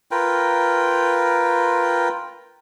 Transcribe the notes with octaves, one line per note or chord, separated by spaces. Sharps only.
F4 A#4 B4 G5